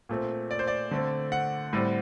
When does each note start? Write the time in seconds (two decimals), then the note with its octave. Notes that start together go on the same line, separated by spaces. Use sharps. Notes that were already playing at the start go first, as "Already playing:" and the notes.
0.09 A#2 A3 C4
0.51 D5
0.59 C5
0.67 D5
0.91 D3 A3 C4
1.32 F#5
1.73 A2 G3 C4